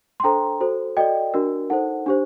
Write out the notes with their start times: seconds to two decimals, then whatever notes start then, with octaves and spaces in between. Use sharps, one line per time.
0.20 C6
0.24 D4 A4 C5 G5 A#5
0.61 F#4 A4 C5
0.97 F#4 A4 D5 D#5 G5
1.34 D4 F#4 A#4
1.70 D#4 A4 C5 F#5
2.06 D4 G4 C5